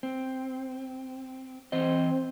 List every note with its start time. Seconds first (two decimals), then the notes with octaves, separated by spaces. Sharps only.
0.03 C4
1.72 E3 C4 C5 D#5